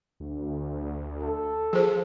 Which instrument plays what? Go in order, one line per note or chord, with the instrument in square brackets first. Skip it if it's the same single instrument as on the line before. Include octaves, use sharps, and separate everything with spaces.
[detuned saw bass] D2
[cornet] A4
[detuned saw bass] F3 [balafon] G#4 C5